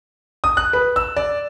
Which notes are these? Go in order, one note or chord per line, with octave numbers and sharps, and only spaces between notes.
D#6
F#6
B4
E6
D5